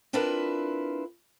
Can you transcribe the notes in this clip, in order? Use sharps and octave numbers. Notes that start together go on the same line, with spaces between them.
C4 D4 E4 F4 A#4 B4